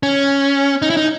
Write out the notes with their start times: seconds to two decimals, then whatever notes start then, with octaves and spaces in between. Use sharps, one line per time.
0.03 C#4
0.82 D#4
0.90 E4
0.97 D#4